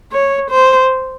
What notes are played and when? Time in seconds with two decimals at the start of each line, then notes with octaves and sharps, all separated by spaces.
0.12 C#5
0.50 C5